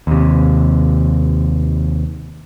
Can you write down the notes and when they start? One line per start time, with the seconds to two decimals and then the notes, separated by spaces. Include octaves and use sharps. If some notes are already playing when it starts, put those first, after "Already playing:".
0.07 D#2 C3